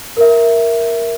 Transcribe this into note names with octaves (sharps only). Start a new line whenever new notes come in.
A#4 E5